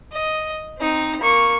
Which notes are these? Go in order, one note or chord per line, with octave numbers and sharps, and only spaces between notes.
D#5
C4 D#4
A#3 C#6